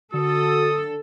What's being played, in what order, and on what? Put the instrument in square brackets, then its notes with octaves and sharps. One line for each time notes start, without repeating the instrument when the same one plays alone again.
[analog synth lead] D3 [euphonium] F#4 [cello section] A4 [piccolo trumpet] D#6